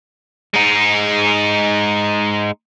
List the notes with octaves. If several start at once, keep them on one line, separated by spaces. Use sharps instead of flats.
G#3 D#4